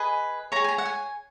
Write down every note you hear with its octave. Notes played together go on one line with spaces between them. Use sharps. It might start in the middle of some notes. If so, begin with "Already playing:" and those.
Already playing: G#4 B4 D#5
G#4 C#5 A#5
G#5
A#5
F#5
G#5